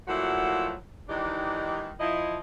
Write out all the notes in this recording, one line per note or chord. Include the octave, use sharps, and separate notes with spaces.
A#2 F3 F#3 A3 E4 F#4
D#3 E3 G#3 D4 D#4 G4
F3 E4 D#5